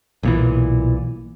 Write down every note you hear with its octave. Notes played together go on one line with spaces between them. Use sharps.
B1 A#2 E3